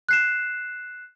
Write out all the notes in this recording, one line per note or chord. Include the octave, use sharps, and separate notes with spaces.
F#6 C7 E7